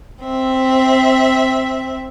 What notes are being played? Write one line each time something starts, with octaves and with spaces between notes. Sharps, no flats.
C4 E5